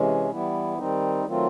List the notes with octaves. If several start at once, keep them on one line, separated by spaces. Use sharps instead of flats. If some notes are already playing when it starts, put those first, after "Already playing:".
Already playing: C3 E3 G#3 C#4
E3 G3 B3 E4
D#3 G3 C4 D#4
D#3 F#3 A3 C4 F4